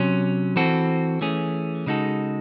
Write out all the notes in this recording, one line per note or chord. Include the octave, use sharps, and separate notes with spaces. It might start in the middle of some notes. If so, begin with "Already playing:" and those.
Already playing: C3 F#3 C#4
E3 C4 F#4 A4
E3 A3 C#4 G#4
C#3 G#3 D#4 F#4 A4